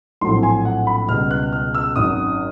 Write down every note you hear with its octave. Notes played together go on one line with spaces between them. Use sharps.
A#1 A2 F#3 A3 C4 C6
G#5
F#5
B5
C#2 B2 G3 F6
F#6
F6
E6
G#1 F#2 D#3 F#3 D#6